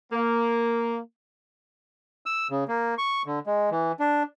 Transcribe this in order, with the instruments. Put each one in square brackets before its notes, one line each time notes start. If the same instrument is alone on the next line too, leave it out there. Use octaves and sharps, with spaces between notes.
[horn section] A#3
[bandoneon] E6
C#3
A#3
C#6
D3
G#3
E3
D4